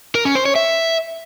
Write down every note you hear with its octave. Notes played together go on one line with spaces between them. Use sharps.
A#4
C#4
C5
C#5
E5